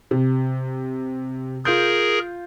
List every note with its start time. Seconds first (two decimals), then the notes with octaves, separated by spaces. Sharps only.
0.11 C3
1.65 F4 G#4 A#4 G6